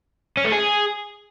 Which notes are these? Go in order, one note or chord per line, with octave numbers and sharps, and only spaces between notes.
C#4
A3
G#4